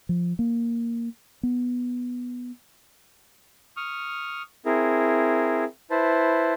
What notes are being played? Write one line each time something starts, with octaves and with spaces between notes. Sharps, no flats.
F3
A#3
B3
C#6 D#6 F6
C4 E4 G#4 A#4
E4 B4 C5 A5